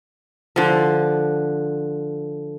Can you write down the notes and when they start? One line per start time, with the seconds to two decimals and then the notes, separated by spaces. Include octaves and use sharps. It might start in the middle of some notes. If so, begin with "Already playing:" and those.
0.56 D3 F3